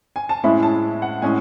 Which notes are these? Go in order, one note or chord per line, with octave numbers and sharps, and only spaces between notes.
G#5
A5
A2 G#3 C#4 E4 B5
A5
F#5
A2 G#3 C#4 G#5